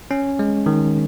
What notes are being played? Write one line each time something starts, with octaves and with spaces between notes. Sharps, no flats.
C#4
G#3
D#3